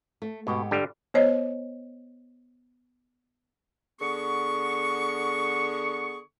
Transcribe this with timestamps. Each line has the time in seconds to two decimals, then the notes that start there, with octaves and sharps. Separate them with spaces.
0.22 A3
0.47 G#2 B2 B3 G4
0.71 G2 D3 G3
1.14 B3 C5 C#5 D#5
3.99 D3 B3 G#4 C#6